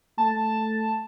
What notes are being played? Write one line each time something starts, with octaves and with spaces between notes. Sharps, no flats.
A3 A5